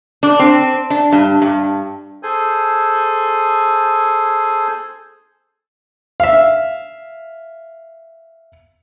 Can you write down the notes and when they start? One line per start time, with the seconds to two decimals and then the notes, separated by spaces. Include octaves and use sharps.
0.23 D4
0.39 C4
0.90 D4
1.12 G2
1.42 G2
2.23 G#4 A4 C5 G#5
6.20 E5 F5